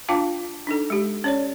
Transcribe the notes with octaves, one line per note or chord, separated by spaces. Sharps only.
D4 F4 F5 G5 A5 D6
D4 D#4 A4
G#3 G4
C#4 C#5 D5